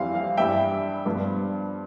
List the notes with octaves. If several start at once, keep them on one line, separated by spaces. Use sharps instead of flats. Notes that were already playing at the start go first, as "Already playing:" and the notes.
Already playing: F2 E3 G3 C4 F5
F5
G2 E3 G3 E5 G5
G2 F3 B3 F4